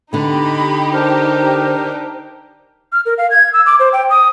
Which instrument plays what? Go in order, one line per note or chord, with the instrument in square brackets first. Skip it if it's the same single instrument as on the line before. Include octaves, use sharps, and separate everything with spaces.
[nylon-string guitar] D3 B3 [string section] D#4 G4 [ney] B5
[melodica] D4 A#4 [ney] C5
[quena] F6
A#4
F5
G#6
E6
D6
C5
G5
D#6